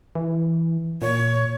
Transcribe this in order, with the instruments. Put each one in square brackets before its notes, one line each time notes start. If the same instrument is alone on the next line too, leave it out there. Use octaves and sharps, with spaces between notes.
[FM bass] E3
[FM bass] A#2 [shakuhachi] C#5